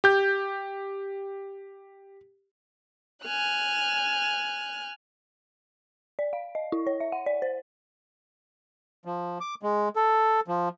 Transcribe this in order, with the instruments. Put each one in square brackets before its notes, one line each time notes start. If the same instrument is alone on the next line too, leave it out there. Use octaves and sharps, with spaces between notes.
[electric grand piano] G4 G6
[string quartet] G#5 F6 F#6
[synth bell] D5
F5
D#5
E4
C#5
E5
F#5
D5
C5
[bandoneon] F3
D6
G#3
A4
F3